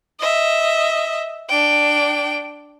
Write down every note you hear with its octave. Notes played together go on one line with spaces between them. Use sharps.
D#5 E5
D4 G5